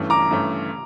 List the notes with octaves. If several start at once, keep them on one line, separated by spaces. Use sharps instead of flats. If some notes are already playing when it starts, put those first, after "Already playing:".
Already playing: G2 E3 A3 C#4
A#5 D6
G2 E3 A3 C#4